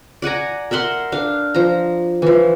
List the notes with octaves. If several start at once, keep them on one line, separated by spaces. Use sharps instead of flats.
D5 F#5 G#5 A#5
A#4 E5 F#5 C6
D4 F5
F3 A#5
E3 F3